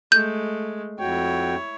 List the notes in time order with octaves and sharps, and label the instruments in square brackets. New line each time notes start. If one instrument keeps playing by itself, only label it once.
[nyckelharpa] G#3 A3 [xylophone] G6
[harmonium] F2 F#4 G5 [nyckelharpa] E4 C#5